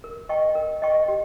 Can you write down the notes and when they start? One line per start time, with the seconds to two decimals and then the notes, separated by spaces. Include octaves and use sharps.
0.04 A#4
0.29 D#5 G5 C#6
0.55 A#4
0.82 D#5 G5 C#6
1.08 G4